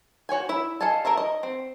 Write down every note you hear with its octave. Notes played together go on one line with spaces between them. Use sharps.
F#4 C#5 G5 G#5
E4 E5
A4 D#5 F5 G#5 A5
A4 A#4 D#5 E5 A#5
D#5
C4